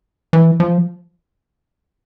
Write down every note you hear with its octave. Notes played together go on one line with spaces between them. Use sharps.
E3
F3